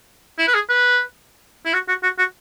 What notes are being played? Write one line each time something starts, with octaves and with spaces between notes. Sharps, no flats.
E4
B4
G#4
B4
E4
F#4
F#4
F#4
F#4